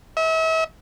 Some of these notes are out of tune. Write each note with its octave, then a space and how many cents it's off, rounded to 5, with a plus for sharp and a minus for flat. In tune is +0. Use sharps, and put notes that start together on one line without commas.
E5 -40